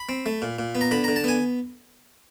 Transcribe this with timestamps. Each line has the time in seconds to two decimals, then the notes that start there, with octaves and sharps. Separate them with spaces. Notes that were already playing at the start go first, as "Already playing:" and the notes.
Already playing: B5
0.09 C4
0.26 A3
0.42 A#2
0.59 A#2
0.75 B3
0.81 A#5
0.91 D3 B5
1.04 D3 A#5
1.16 A5
1.24 B3 G#5